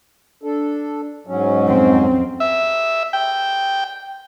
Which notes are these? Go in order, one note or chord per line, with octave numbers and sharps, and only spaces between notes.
D4 A4
G#2 F#3 C#4
F2 C4
E5
G5